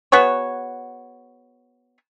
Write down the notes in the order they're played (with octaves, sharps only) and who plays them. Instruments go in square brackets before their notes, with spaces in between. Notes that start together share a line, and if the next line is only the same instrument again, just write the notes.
[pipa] B3 F#4 G#4 C#5